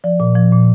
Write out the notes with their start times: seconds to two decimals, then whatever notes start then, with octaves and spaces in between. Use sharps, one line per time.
0.04 F3 D5
0.20 A#2
0.35 F3
0.52 A#2